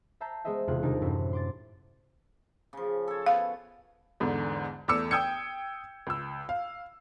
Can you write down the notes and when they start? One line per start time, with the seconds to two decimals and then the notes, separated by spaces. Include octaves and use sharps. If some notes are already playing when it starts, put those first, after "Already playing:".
0.21 E5 A5 A#5 G6 C7
0.45 G#3 B3 G#4 C5 D#5 E5
0.67 D#1 E2 C3 B3 F4 F#6
0.82 D#2 C3 G3 D4 D#4
1.02 F#2 A2 C3 C#4 E4
1.33 C6 D6 A6
2.73 C#3 F3
3.08 A4 C#5
3.26 B3 F5
4.20 E2 G#2 D3
4.88 E2 A3 D6 E6 C#7
5.11 G5 D#6 E6 G6 G#6 C#7
6.07 C#2 E6
6.49 F5